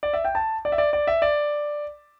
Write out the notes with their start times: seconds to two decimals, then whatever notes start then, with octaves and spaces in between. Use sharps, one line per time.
0.03 D5
0.13 E5
0.24 G5
0.35 A5
0.65 D5
0.72 E5
0.78 D5
0.93 D5
1.07 E5
1.22 D5